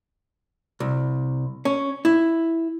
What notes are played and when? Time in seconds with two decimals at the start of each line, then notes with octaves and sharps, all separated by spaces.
0.80 C2
1.65 C#4
2.05 E4